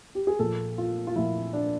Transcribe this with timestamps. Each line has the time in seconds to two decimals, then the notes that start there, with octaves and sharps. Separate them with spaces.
0.15 G4
0.27 G#4
0.39 A#2 F3 A4
0.78 F4
1.07 F4
1.16 F3 E4
1.18 A#2
1.53 D4